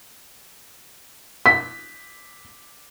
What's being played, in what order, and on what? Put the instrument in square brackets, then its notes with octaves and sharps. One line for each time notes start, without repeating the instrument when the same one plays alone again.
[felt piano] B6